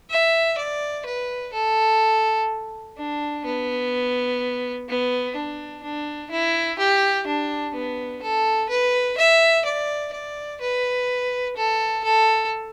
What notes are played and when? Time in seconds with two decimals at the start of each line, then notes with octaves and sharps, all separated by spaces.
0.10 E5
0.58 D5
1.06 B4
1.53 A4
2.97 D4
3.45 B3
4.89 B3
5.35 D4
5.83 D4
6.31 E4
6.79 G4
7.26 D4
7.75 B3
8.22 A4
8.69 B4
9.17 E5
9.65 D5
10.13 D5
10.61 B4
11.57 A4
12.04 A4